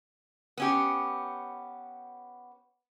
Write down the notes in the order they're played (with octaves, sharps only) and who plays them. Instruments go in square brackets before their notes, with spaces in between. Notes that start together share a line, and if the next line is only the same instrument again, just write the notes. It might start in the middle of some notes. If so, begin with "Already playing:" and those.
[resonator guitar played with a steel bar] B3 C#4 G4